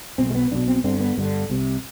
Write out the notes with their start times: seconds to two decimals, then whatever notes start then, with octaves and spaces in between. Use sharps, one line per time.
0.18 B1 B2 C4
0.30 G#3
0.35 B3
0.51 B1 B2 D4
0.68 C4
0.84 G1 G2 D3 C4
1.00 B3
1.18 G1 G2 D3
1.50 C2 C3